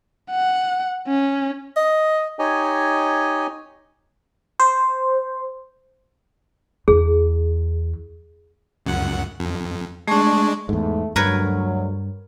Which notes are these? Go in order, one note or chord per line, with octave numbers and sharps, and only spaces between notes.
F#5
C#4
D#5
D#4 G4 C#5 D#5 G#5
C5
E2 G#4
C#2 F#2 F#5
F2
G#3 A3 D4 G#4 C#6
E2 G#2 A3
D2 G2 F#3 A#4 B4 C#5